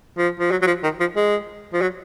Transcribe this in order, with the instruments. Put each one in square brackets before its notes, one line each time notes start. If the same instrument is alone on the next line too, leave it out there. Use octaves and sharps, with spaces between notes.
[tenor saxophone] F3
F3
F#3
F#3
F3
D#3
F3
G#3
F3
F#3